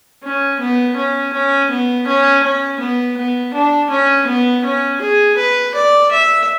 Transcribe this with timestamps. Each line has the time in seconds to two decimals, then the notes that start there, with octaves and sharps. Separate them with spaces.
0.23 C#4
0.60 B3
0.96 C#4
1.33 C#4
1.70 B3
2.07 C#4
2.43 C#4
2.80 B3
3.17 B3
3.54 D4
3.90 C#4
4.27 B3
4.64 C#4
5.01 G#4
5.37 B4
5.75 D5
6.12 E5